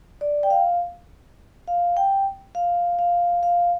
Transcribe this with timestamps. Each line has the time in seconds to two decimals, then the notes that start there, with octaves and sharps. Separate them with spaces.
0.21 D5
0.43 G5
0.50 F5
1.68 F5
1.97 G5
2.55 F5
2.99 F5
3.43 F5